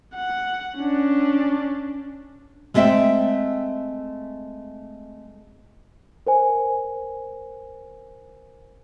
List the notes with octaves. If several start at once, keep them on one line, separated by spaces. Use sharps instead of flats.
F#5
C#4 D4
G#3 A3 C4 D#5 E5 G5
A#4 C5 G#5